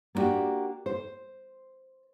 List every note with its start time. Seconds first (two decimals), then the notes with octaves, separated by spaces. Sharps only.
0.15 A#3 B3 D4 F#4 G4
0.86 C5